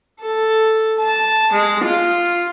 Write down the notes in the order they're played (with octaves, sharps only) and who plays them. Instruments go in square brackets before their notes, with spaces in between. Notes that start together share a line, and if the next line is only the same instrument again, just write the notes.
[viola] A4
A5
G#3
F4